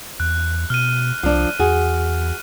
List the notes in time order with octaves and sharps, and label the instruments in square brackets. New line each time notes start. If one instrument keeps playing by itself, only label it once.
[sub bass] E2 [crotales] F#6
[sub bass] B2 [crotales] F6 D#7
[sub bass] C2 [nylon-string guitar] F3 D4
[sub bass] E2 [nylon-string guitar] F#4 G#4